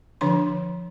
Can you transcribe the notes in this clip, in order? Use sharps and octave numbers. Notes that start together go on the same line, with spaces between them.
D3 F3 D4 C#5 C6